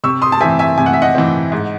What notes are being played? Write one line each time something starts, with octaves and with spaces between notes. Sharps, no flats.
C3 C#6 E6
C6 D#6
A5
E3 C4 E5 G#5
E5 G#5
C3 G#5
F#5
E5
D#5 F#5
E3 C4
G#2